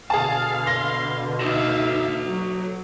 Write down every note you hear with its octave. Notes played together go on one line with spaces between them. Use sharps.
B2 D3 G#4 F5 A5
C6 A#6
D#4 F#4 A4 E5 F5
F#3